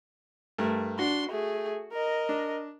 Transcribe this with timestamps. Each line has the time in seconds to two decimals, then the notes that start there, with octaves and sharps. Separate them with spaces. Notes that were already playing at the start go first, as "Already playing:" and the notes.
0.58 G2 A3 A#4
0.99 D4 F#4 C6
1.30 A3 G#4
1.92 A#4 D#5
2.29 D4